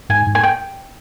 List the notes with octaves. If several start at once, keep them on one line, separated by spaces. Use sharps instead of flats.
G#2 G#5
G#2
G#5
G5